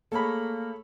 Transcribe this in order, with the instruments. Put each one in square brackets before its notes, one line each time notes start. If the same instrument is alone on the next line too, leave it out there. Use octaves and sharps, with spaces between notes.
[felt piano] A3 G#4 [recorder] A#3 [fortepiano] A4 C#5 B5